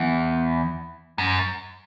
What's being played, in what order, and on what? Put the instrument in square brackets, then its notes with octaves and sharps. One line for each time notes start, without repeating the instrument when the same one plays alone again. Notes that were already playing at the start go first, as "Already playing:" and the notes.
Already playing: [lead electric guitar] E2
F#2